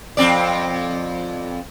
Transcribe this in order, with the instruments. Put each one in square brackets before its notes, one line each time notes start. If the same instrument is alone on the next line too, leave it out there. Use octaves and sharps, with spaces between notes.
[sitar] F2 C4 D5